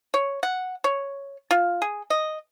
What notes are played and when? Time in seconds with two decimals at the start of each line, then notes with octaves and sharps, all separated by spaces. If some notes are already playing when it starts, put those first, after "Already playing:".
0.14 C#5
0.43 F#5
0.84 C#5
1.51 F4
1.82 G#4
2.10 D#5